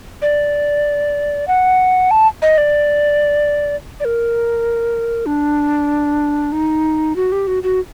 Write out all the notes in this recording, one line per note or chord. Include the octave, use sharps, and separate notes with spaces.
D5
F#5
A5
D#5
D5
D5
A#4
D4
D#4
F#4
G4
F#4
F#4